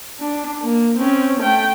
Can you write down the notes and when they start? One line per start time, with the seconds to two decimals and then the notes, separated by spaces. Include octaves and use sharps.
0.20 D4
0.62 A#3
0.98 C4 C#4
1.40 A3 G5